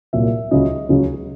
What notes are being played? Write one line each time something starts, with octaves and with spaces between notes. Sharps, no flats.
C2 A#2 F#3 E5
C#2 C#3 F#3 D#5
C#2 C#3 F#3